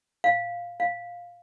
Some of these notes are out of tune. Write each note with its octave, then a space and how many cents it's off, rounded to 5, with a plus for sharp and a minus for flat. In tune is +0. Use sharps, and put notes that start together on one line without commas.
F5 +0
F5 +5